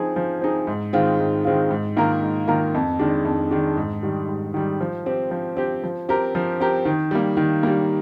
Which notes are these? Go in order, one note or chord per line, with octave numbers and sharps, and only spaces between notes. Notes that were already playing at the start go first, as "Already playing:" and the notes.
Already playing: F3 C4 D#4 G#4
F3
C4 D#4 G#4
G#2
D#3 G#3 C4 F4
G#2
D#3 G#3 C4 F4
G#2
D#3 A#3 F4 A#4
G#2
D#3 A#3 F4 A#4
F2
D#3 G#3 D4
F2
D#3 G#3 D4
G#2
D#3 G3
G#2
D#3 G3
F3
C4 G4
F3
C4 G4
F3
C4 G4 A#4
F3
C4 G4 A#4
D#3
G3 A#3
D#3
G3 A#3